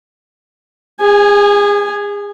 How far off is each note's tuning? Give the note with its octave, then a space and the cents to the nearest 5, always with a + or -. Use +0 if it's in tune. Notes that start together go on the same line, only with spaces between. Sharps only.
G#4 -35 G#5 +0